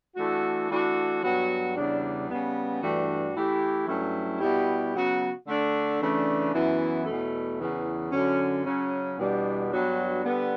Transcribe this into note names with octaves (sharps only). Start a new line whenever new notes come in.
E3 A3 D4 F#4
E3 A3 D4 F#4
G2 F#3 B3 F#4
E2 C#3 G3 D4
C#3 G3 B3
G2 E3 A3 D4 F#4
E3 A3 E4 G4
G2 F#3 A3 C#4 E4
B2 G3 B3 E4 G4
C#3 F#3 B3 F#4
D3 A3 D4
C#3 E3 A3 D4
F#2 E3 B3 E4
E2 B2 A3
E2 C#3 E3
F#2 D3 F#3 C#4
C#3 F#3 C#4
E2 B2 G3 D4
G2 F#3 B3 D4 F#4
D3 G3 B3